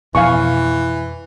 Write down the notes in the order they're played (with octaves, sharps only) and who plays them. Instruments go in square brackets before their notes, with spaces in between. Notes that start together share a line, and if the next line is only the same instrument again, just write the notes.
[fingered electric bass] F2 B2 F3 [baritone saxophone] E3 [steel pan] F5 G#5 C#6